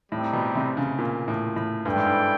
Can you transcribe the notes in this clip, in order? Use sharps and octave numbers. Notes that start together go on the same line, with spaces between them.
A2 G3 C4 D#4
B2
C3
C#3
A#2
A2
A2
G2 E4 A4 D5 G5
G#2
G2